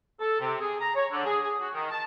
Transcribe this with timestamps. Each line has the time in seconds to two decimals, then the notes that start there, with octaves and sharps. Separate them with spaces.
0.21 A4
0.40 C3
0.61 G#4
0.81 A#5
0.95 C#5
1.12 D3
1.26 G#4
1.43 G#4
1.60 F#4
1.74 D#3
1.91 A5